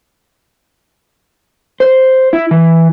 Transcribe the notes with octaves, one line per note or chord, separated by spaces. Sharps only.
C5
E4
E3